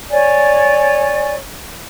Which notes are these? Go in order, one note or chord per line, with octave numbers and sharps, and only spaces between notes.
C#5 D5 G#5